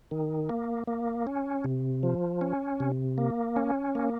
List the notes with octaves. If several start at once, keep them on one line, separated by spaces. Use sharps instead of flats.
D#3
A#3
A#3
C#4
C3
F3
C#4
C3
A#3
C#4
A#3